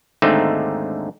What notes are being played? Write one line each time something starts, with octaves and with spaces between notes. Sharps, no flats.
D#2 G#2 D3 A3 C4 D#4